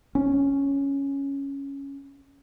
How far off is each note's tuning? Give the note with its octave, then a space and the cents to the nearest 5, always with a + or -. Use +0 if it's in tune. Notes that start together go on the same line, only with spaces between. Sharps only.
C#4 +0